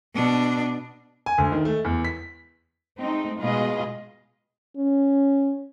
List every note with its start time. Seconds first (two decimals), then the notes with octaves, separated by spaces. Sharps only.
0.15 B2 D4
1.26 G#5
1.38 D2
1.52 D#3
1.65 A3
1.85 E2
2.05 B6
2.99 G#3 A3 C4 D#4
3.38 B2 G#3 F4 G#4 B4 D#5
4.77 C#4